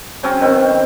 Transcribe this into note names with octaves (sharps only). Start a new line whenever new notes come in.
C#3 F#3 C4 C#4
D#3 B3 C4